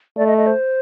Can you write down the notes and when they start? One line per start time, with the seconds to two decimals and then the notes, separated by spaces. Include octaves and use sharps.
0.17 A3 D5
0.27 D#5
0.37 D#5
0.47 C5